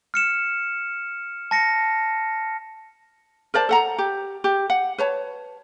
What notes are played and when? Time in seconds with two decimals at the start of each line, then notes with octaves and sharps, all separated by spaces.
0.14 F6 C#7 E7
1.51 A5 A#6 C#7
3.54 A#4 C5 D5 A5
3.69 A4 F#5 A#5
3.98 G4
4.44 G4
4.70 F#5
4.98 B4 C#5 A5